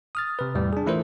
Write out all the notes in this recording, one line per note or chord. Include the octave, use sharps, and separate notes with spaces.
D#6 F6 A6
C3 B4
E2 A2 G3
D4 G#4
E3 A3 E4 F4 A#4 C5